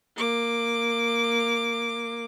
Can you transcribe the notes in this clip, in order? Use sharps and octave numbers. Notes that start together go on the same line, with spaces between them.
A#3 D6